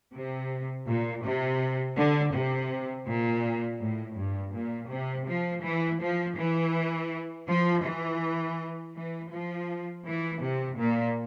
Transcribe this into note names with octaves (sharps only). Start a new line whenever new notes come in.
C3
A#2
C3
D3
C3
A#2
A2
G2
A#2
C3
F3
E3
F3
E3
F3
E3
E3
F3
E3
C3
A#2